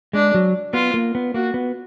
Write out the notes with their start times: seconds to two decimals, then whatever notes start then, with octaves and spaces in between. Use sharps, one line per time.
0.13 G#3 D4
0.34 F#3
0.73 B3 F4
0.94 A#3
1.15 B3
1.34 A#3 F#4
1.54 B3